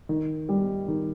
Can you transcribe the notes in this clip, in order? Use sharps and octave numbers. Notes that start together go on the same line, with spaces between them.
D#3
G3
D#3